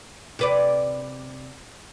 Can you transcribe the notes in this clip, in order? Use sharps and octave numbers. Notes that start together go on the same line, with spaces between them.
C3 B4 D5